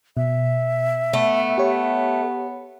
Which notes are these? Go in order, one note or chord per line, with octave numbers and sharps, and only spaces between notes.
B2 E5
A3 B3
G4 C#5